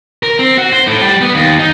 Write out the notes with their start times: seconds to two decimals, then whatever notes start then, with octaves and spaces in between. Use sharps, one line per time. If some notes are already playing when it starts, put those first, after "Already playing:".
0.23 A#4
0.39 C4
0.58 F#4
0.73 C5
0.87 A2
1.03 G3
1.22 B3
1.35 D#2
1.59 D#4